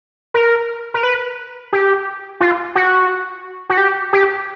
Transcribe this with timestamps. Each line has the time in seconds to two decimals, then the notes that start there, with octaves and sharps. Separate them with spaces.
0.34 A#4
0.94 A#4
1.03 B4
1.73 G4
2.41 F4
2.75 F#4
3.69 F#4
3.78 G4
4.13 G4